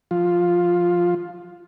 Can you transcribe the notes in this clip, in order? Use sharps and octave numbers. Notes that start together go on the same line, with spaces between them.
F3 F4